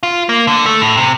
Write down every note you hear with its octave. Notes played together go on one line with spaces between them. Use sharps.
F4
A#3
D3
A3
A2
C3